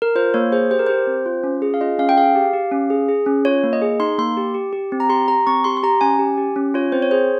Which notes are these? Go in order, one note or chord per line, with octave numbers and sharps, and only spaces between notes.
A#4
F4 C5
A#3 C#5
G#4 C5
G4 C5
A#4
G4 C5
C4
F4
C#4
G#4
F5
F4 D#5
C#4 F5
G5
G#4 F5
G4
G4
C#4
G#4
G#4
C#4
F4 C#5
A#3
D#5
G#4
D#4 C6
A#3 C6
G4
G4
G4
C4
A#5
G4 C6
G4 A#5
C4 C#6
G4 C6
C6
G4 A#5
C#4 G#5
G4
G4
C#4
F4 C#5
C4 C5
C#5
G#4 C5